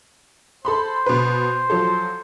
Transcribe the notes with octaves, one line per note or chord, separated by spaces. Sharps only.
A4 C5 B5 C6
B2 B4
F3 F#3 A4